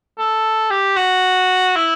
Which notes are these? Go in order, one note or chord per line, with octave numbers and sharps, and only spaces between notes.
A4
G4
F#4
E4